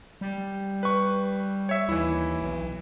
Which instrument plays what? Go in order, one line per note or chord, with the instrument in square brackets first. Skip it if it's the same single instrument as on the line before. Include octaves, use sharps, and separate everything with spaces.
[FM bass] G3
[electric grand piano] B4 C#6
C#5 E5
[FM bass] D#2 [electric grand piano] E3 E4
[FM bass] B1